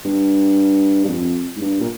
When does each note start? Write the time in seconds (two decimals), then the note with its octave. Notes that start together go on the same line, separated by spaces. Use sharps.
0.05 G2
1.05 G2
1.09 F2
1.56 G#2
1.61 G2
1.81 A#2